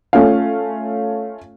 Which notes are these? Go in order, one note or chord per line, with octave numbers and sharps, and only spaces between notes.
A3 C#4 F4 C#5 F5